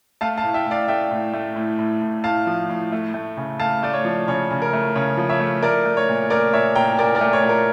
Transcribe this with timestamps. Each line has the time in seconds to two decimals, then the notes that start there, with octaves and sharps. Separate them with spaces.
0.21 A3 F5 A5
0.38 F5 A5
0.43 A2
0.54 E5 G5
0.66 A2
0.71 D5 F5
0.88 A3 E5 G5
1.11 A2
1.33 A3
1.56 A2
1.79 A2
2.02 A2
2.24 A2 F5 A5
2.47 F3
2.69 A2
2.92 A3
3.14 A3
3.37 C#3
3.60 A3 F5 A5
3.83 A3 D5
3.93 C#5
4.05 F3
4.28 C#3 C#5
4.51 C#3
4.62 A#4
4.73 A3
4.95 C#3 C#5
5.17 F3
5.29 C#5 E5
5.40 A3
5.62 A3 A#4 D5
5.85 A3
5.97 C#5
6.09 A#2
6.30 A3 A#4 D5
6.53 A#2 C#5 E5
6.75 A#2 G5 A#5
6.98 A#2 A#4 D5
7.15 A#4 D5
7.21 A3
7.33 C#5
7.43 A#2
7.49 A#4